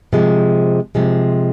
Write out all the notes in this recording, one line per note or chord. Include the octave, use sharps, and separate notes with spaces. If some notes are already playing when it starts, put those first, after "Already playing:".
C3 F3 G#3
C3 F3 G#3